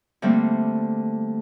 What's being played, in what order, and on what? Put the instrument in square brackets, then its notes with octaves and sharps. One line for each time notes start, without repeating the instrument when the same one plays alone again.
[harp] D3 G3 A3 A#3 C4